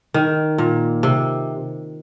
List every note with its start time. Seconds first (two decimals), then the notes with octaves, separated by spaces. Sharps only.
0.14 D#3
0.58 A#2
1.03 C3